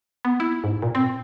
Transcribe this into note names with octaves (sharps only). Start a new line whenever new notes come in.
B3
E4
G#2
A#2
C4